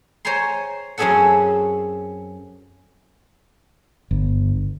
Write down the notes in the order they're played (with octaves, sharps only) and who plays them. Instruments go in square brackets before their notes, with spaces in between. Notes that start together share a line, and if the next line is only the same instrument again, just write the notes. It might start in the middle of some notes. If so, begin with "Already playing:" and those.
[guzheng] C5 C#5 G5 G#5 A#5 C6
F#2 C4 C#4 G#4 A4 F#5
[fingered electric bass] G1